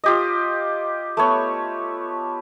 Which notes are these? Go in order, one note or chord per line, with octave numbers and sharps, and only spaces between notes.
F4 G4 D#5
A3 B3 C#5